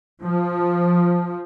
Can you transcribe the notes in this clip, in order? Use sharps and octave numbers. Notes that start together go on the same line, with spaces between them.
F3